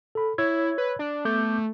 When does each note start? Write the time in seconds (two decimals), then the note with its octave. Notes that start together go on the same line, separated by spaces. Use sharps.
0.15 A4 B5
0.38 E4 C#5 E6 G#6
0.78 B4
0.99 D4
1.25 A3 B3 D6 G6